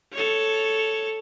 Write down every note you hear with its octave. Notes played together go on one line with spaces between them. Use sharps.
A4 C#5